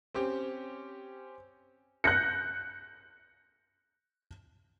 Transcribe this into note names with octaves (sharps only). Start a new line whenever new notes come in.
C4 C#4 G4
F#6 G6 A#6 C#7